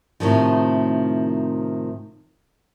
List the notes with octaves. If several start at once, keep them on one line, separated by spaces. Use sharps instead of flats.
A2 C3 D#3 F3